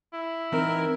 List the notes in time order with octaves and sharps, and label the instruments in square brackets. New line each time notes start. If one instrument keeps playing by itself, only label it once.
[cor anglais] E4
[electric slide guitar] E3 C4 D#4 [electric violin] A#4